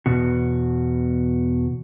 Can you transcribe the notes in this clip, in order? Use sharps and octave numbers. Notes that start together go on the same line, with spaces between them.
E2 B2 F#4